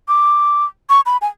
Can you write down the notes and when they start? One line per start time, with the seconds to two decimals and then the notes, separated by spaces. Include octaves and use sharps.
0.08 D6
0.89 C#6
1.06 B5
1.22 G#5